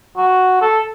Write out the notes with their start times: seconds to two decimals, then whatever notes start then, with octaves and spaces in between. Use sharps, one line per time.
0.17 F#4
0.62 A4